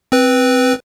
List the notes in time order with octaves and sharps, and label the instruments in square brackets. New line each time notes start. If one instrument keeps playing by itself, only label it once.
[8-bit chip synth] C4 B4